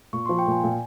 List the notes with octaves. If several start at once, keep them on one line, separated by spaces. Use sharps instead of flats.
A#2 C#6
F3 C6
G5
A#2 G#5
A#2